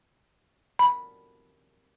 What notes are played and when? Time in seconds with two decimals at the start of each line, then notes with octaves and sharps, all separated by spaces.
0.79 B5